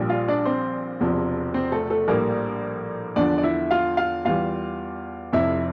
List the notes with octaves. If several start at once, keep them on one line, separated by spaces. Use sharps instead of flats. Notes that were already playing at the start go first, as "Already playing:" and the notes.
Already playing: A#1 A#2 G3
F4 F5
D4 D5
C4 C5
E1 E2 C3 F3
C4 C5
A3 A4
A3 A4
A#1 A2 G3 A#3 A#4
E2 D3 F3 D4 D5
D5
E4 E5
F4 F5
F4 F5
E2 E3 G3 F4 F5
F1 F2 C3 E4 E5